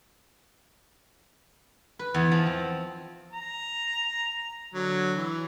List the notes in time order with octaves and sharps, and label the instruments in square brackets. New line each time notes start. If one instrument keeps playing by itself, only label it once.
[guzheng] B4
E2
F3
C4
[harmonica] A#5
D3 F#3
E3